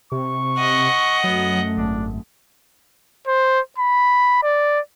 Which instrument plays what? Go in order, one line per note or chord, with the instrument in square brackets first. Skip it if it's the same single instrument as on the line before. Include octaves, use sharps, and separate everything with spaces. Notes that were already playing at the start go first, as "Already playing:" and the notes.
[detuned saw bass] C3 [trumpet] C#6
[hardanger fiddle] D#5 F#5
[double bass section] F#2 A3 [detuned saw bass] F#3 [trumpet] B3
[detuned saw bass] G#1 [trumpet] D4
[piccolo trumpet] C5
B5
D5